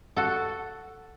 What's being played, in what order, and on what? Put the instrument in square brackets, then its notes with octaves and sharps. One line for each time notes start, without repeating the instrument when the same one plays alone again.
[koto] F#4 A4